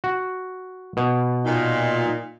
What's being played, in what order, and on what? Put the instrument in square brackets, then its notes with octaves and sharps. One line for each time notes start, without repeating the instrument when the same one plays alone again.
[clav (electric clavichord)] F#4
B2
[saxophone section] A#2 D#4